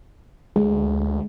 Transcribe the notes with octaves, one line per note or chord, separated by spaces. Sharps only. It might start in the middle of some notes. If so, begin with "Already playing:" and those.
D2 G#3